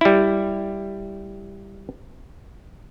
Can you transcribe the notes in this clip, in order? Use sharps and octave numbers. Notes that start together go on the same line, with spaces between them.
G3 E4